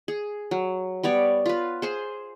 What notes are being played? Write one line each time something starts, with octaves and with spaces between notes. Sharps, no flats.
G#4
F#3
G3 B3 C#5 D5
F4 B4
G#4 C5 C6